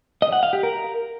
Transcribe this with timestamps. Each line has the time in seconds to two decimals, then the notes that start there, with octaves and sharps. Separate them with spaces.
0.22 D#5
0.33 F#5
0.43 F5
0.53 G4
0.63 A#4